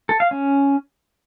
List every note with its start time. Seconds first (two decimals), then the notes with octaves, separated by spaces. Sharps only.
0.09 A4
0.20 F5
0.31 C#4